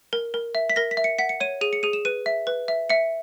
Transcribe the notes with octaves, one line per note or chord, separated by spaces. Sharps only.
A#4
A#4
E5
B6
A#4 A#6
B6
E5
C#7
F#5 B6
C#7
C#5 D#7
G#4 D#7
C#7
G#4 D#7
E7
B4 D#7
E5
B4
E5
E5 C#7